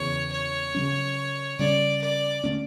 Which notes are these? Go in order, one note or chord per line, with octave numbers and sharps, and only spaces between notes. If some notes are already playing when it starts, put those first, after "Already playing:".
Already playing: E2 C#3 E3 C#5
C#5
C#3 F#3 C#4
C#3 G3 C#4 D5
D5
D3 A3 C#4